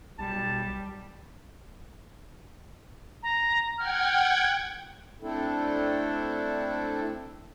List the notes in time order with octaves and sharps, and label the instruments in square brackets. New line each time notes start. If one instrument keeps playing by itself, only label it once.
[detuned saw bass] B1 [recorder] G3 [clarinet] A5
[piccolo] A#5
[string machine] F#5 G5 G#6 [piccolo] F6
[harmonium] A3 C4 D4 E4 A4